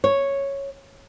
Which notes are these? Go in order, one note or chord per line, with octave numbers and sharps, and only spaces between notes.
C#5